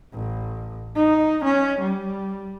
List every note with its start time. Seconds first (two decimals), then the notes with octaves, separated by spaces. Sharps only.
0.13 A1
0.95 D#4
1.44 C#4
1.80 G3